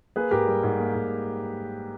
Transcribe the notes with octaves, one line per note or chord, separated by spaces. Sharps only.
A#3 G#4 B4
G#2 G4 A#4
G3
G#2
A#3
G#2